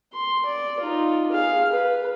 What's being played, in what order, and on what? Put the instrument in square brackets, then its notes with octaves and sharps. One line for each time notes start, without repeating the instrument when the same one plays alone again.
[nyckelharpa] C6
D5
D#4 F4
G#4 F5
B4